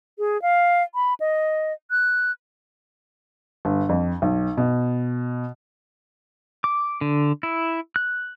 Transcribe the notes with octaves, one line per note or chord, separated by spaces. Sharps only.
G#4
F5
B5
D#5
F#6
G1
F2
B1
B2
D6
D3
E4
F#6